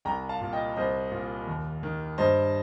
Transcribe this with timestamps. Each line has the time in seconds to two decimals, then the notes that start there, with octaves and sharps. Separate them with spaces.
0.05 C2 G5 A#5
0.29 F5 A5
0.41 A#2
0.53 D#5 G5
0.76 C2 C5 D#5
1.11 A#2
1.47 D#2
1.83 D#3
2.18 G2 C5 D#5